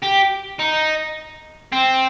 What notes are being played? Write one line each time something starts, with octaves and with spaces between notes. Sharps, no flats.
G4
D#4
C4